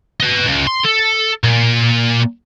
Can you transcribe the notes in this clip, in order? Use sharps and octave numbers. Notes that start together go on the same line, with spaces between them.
B4 D#5
C#2
C6
A4
A#2